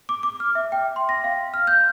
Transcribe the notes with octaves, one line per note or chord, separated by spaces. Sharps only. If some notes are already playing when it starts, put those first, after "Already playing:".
D6
D6
F6
E5
G5
C6
A#6
F5
F6
G6